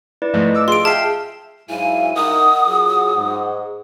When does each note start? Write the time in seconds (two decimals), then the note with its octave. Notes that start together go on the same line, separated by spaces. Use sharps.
0.22 E4 B4 D5
0.34 G#2 F3 A3 D#5
0.54 D6 E6
0.68 F4 G#4 F5 C6 D7
0.85 G#4 E5 G5 A5 F6 C7
1.69 G#2 F#3 E4 F5 G#5
2.16 D#4 E4 A#4 F#5 D#6
2.67 F#3 F4 G#4
3.15 G#2